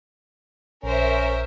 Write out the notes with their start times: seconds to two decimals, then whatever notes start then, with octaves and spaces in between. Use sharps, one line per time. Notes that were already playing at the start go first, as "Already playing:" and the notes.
0.84 A#1 C#4 A#4 C5 E5